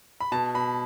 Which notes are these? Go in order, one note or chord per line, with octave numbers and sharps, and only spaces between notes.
B5
B2 A5
B2 B5